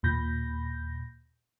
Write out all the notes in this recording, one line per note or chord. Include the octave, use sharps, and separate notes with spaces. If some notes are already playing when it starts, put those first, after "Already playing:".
D#2 A#2 B5 G6 A#6